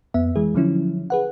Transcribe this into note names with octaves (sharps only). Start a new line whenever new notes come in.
F2 B3 E5
E3 G#3 G#4
D3 F3 F#3 C#4 E4
G#4 B4 F#5